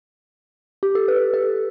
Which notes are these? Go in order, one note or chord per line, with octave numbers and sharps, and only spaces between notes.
G4
A4
B4
A4